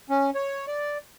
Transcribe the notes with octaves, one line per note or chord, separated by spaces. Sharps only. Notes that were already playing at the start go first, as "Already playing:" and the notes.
C#4
C#5
D5